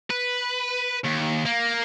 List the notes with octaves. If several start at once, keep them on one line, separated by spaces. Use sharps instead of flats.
B4
D#2
A#3